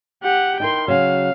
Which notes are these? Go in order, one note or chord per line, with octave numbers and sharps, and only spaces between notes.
G4 F#5
D#4 E4 A#4 G5 C6
C#3 F#3 F5